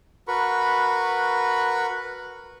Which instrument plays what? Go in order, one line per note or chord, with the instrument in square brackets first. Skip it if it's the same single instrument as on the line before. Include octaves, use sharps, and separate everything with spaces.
[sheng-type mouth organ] F#4 A#4 B4 B5 C#6